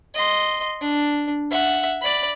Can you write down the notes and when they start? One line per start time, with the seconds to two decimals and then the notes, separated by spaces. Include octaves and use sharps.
0.15 D#5 C6
0.81 D4
1.50 E5 F#5
2.01 D5 B5